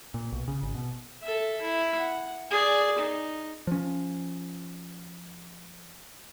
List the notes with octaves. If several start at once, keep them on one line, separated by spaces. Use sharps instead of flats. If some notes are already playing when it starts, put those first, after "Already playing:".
A#2
B1
C#3
G#1
B2
A4 E5
E4
F#5
G#4 D5
D#4
F3 C#4